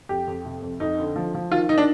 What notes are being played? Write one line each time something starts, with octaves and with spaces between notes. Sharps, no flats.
F2 G4
F2
C3
F2
F2 D#4
D3
F3
F3
D#3 F4
D#3 D#4
D4